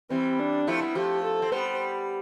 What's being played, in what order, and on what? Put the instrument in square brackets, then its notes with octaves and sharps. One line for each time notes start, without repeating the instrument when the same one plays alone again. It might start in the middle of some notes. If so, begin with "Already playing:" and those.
[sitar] E3 G3 [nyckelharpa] C4
[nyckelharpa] D4
[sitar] F3 A3 [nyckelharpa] E4
[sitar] G3 B3
[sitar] F3 A3 [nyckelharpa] G4
[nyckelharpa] A4
[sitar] C4
[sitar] G3 B3 [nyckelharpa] C5